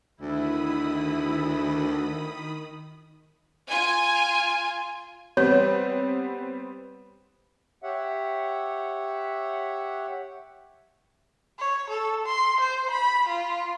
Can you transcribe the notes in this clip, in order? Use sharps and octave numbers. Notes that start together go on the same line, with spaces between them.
D2 D#3 E4 B5 D#6
F4 G#5
G3 B3 C4 C#5
G4 C#5 E5 F#5
C#5
A4
C6
C5
B5
F4